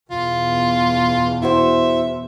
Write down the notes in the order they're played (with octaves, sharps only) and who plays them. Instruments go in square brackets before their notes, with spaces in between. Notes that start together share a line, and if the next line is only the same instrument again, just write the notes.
[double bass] E2 B2 [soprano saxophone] F4
[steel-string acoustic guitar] E4 F#4 C5 [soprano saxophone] E5